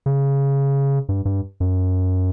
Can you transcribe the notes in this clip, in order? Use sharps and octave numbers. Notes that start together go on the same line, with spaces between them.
C#3
G2
G2
F#2